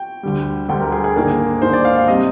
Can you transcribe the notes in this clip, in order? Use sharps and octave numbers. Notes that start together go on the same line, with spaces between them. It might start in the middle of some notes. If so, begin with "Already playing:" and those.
Already playing: G5
D2 D3 G3
D2 D3 G3 G5
A#4
G#4
G#4
G#2 D#3 A#3 D4 G#4
G#2 D#3 A#3 D4 C5
D5
F5
F5
C3 G3 C4 D#5